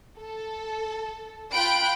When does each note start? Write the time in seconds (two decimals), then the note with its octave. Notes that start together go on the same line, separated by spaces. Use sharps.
0.18 A4
1.51 F4 F5 G5 B5 F#6 D7